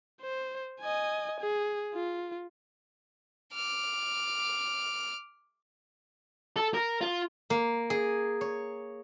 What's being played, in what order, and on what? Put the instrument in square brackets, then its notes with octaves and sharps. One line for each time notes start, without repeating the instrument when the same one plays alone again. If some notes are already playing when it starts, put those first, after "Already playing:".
[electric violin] C5
D#5 G#5
G#4
F4
[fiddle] D6 F6
[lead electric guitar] A4
A#4
F4
[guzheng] A#3
G#4
C#5